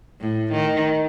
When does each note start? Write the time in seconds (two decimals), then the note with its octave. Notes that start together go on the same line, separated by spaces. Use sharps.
0.21 A2
0.52 D#3